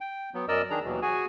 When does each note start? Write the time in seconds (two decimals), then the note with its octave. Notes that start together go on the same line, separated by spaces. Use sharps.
0.01 G5
0.34 F#3 B3
0.48 F#2 A#4 D5 D#5 E6
0.70 D#3 D4 G#4 A#5
0.85 D#2 B2 E3 F#3
1.02 F#4 G#4 G#5